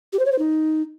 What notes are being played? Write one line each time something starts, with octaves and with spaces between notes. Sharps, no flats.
G4
C5
C#5
C5
D#4